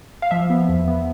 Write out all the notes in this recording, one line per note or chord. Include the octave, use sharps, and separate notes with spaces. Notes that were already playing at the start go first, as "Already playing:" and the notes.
F5
F3 E5
B3
E2
B3